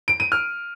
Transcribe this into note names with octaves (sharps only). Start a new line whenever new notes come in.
D7
D#7
F6